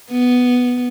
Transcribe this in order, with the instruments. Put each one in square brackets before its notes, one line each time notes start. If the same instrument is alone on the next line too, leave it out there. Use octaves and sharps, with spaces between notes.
[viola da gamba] B3